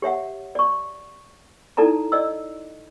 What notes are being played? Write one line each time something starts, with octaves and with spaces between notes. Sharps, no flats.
G4 C#5 E5 F#5
D5 C#6
D#4 E4 A4 D5 A5 A#5
D5 D#5 E6